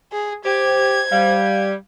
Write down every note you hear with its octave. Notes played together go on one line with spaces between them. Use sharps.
G#4
G4 C5 G#6
G3 F5